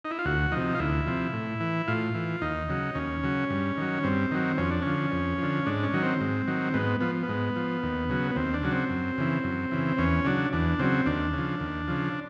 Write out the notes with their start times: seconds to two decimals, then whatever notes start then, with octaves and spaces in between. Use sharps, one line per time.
0.05 D#4
0.11 E4
0.19 F4
0.25 D2 F#4
0.52 C3 F3 D#4
0.75 F4
0.79 D2 E4
1.06 C3 F3
1.33 A2
1.60 E3
1.88 A2 F4
2.15 E3
2.42 D#2 D#4
2.69 C#3 F#3
2.95 D#2 C#4
3.23 C#3 F#3
3.50 G2
3.77 D#3 F#3
4.03 G2 C4
4.31 D#3 F#3
4.58 F2 C#4
4.71 D4
4.82 D3 F3 C#4
5.12 F2
5.38 D3 F3
5.66 G#2 D4
5.83 C#4
5.93 D#3 F#3
6.02 C4
6.20 G#2
6.47 D#3 F#3
6.74 G#2 B3
7.00 F3 B3
7.23 B3
7.28 G#2
7.56 F3
7.83 D#2
8.09 C#3 F#3
8.31 B3
8.36 D#2 C4
8.54 D4
8.63 C#3 F#3
8.72 C4
8.90 F#2
9.18 C#3 E3
9.44 F#2
9.71 C#3 E3
9.98 E2 C#4
10.25 C#3 F#3 D4
10.53 E2 D4
10.79 C#3 F#3 C4
11.06 D#2 D4
11.34 C#3 F3
11.60 D#2
11.88 C#3 F3